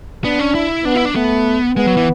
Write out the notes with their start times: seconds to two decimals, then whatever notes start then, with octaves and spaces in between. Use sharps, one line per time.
0.24 B3 D4
0.40 C#4
0.55 E4
0.85 B3 D4
0.95 E4
1.05 D4
1.15 A3 B3
1.76 G#3 B3
1.87 F#3
1.97 E3